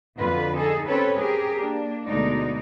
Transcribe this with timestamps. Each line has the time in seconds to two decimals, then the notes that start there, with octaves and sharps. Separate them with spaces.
0.17 F2 D3 F#3 F4 B4
0.57 D#4 G#4 A4
0.87 C4 C#4 G4 A4 B4 C#5
1.17 G4 G#4 A#4
1.60 A#3 D4
2.05 D2 B2 G#3 D#4 D5